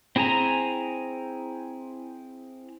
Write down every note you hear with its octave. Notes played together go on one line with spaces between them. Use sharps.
C4 E4 G#4 G#5 A#5